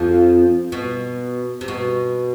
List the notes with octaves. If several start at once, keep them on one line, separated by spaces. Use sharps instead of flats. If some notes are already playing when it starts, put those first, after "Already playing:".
Already playing: F2 F3
B2
C3
B2